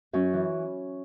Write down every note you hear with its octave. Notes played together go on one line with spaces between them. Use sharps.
F#2 C#4
E3